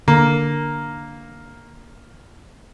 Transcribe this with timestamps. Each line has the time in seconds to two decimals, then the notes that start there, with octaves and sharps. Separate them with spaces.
0.08 D3 A#3